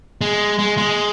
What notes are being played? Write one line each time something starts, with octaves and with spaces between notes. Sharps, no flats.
G#3
G#3
G#3